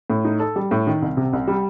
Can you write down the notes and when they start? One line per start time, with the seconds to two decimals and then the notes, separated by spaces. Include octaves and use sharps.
0.10 A2
0.25 D#4
0.40 A4
0.56 G3
0.71 A2
0.87 D#3
1.02 C2
1.17 C3
1.33 C2
1.47 G3